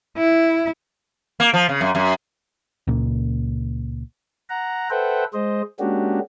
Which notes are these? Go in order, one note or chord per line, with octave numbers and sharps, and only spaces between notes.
E4
A#3
F3
C#3
F#2
F#2
C#2 A#2
F#5 A#5
A4 B4 C5 E5 F#5 G5
G#3 C5 D#5
G#3 A#3 C#4 D4 F#4 G4